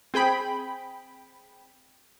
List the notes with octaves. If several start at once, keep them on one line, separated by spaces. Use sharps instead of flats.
C4 G#4 G5 B5